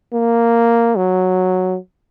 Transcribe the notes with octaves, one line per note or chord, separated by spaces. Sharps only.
A#3
F#3